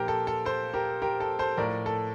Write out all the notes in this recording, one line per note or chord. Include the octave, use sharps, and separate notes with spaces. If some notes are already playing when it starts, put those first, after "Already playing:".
Already playing: A#2 F3 G4 A#4 C5
A4
A4
A4 C5
G4 A#4
G4 A#4
A4
A4 C5
A2 F3 A#4 D5
A4